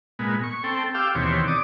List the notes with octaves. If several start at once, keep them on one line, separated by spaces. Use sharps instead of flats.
A#2 G#3 B3
C#6
C4 A4 G5
G4 F5 G5 D6 E6
D#2 B2 E3 C4 G4 C#5
D5 D6 D#6